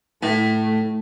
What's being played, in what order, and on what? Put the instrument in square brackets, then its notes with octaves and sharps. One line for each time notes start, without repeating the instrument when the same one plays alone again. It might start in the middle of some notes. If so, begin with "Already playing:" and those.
[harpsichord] A2 [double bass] A3